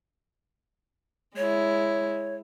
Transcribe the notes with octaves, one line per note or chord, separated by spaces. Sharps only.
G#3 E4 C#5